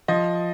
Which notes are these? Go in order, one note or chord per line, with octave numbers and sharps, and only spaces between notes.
F3 D#5